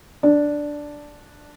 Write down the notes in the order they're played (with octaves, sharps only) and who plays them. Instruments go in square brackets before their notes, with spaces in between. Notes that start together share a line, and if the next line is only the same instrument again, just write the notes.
[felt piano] D4